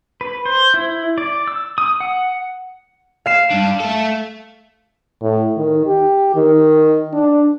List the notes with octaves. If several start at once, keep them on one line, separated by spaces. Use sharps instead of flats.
B4
C5
E4
D5
E6
D#6
F#5
F5 C7 E7
G2 D4
A3 A4
A2
D#3
G4
D#3
D4